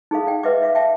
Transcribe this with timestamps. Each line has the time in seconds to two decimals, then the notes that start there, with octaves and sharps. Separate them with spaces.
0.11 D#4 G#4 A4 F5
0.27 D5 G5
0.43 B4 D#5 E5 F#5 D6
0.62 E5 F5 D6
0.75 E5 G5 A5 D6